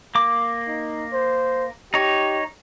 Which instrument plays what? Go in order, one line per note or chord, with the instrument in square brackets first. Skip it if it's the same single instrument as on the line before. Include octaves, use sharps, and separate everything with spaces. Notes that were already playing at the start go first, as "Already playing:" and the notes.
[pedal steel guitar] A#3 D6
[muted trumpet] D#4
C5
[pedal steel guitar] D#4 C#5 [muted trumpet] G4